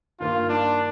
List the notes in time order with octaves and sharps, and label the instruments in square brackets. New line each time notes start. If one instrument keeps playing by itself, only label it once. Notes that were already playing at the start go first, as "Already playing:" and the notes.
[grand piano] G2 D#3 A#3 [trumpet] F4
[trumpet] D4